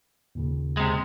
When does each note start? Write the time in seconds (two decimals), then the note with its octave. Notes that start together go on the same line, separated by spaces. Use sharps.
0.35 D#2 A#2 C#3
0.77 C3 G#3